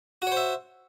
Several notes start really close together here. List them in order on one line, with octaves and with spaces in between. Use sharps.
F#4 C#5 C5 E5